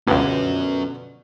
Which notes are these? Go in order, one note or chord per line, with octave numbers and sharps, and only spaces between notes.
C#2 G2 B2 D3 F3 C#4 F#4